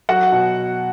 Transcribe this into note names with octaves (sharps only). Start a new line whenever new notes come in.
F#3 F#4 F#5
B2